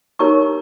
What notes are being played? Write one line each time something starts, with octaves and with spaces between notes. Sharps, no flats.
D#4 G4 A#4 C#5 A#5 C#6